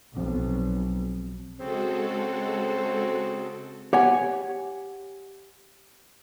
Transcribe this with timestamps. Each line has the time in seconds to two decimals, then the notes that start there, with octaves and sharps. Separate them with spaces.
0.17 B1 F3 C4
1.59 C#3 G#3 C4 F#4 A4
3.93 G4 C#5 F#5 G#5